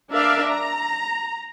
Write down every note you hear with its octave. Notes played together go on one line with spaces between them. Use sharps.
D4 A#4 D5 E5 F5
A#5